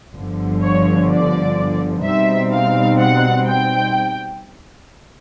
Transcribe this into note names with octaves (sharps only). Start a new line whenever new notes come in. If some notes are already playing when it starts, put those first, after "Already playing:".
G1 G2 D3 F3
C#5
D5
B2 G3 C4 D#4 E5
F5
F#5
G5